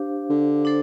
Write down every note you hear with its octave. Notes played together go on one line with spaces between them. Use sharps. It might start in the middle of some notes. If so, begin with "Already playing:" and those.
Already playing: D4 G4 C5 F5
D3
D4 A4 C5